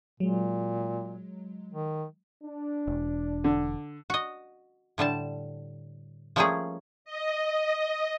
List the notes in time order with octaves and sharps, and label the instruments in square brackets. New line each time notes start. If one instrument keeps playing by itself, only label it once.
[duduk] A#2 [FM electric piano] F#3 G#3
[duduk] D#3
[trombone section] D4
[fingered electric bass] E1
[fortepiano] D3
[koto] F#4 D#5
A2 D3 G3 A5
F3 G3 A3 A#3 C#4 G#4
[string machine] D#5